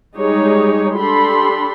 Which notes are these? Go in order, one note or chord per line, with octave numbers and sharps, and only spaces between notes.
G3 G#3 D#4 G4 G#4 C#5
D4 G4 A4 B5 C6